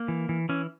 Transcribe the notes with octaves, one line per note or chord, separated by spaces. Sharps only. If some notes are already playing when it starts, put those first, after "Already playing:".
Already playing: A#3
E3
E3
E3 C#4